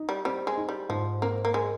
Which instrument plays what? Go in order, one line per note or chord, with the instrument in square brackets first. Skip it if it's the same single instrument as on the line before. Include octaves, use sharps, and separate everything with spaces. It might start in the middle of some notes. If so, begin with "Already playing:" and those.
Already playing: [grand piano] D#4
[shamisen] G3
[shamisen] G3 [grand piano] C4
[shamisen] G#3
[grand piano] D#4
[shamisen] G3
[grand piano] G#2 [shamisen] F3
[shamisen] A#3 [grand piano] C4
[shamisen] A#3
[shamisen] G#3 [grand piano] A#4